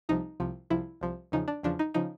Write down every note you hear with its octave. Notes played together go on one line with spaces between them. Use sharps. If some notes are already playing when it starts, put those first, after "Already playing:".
C2 C3 F3 D#4
C2 C3 F3
C2 C3 F3 E4
C2 C3 F3
E2 C#3 F3 D#4
D4
E2 C#3 F3 D4
D#4
C#3 F3 D#4